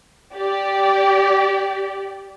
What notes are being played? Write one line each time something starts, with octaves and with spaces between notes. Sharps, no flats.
G4 D5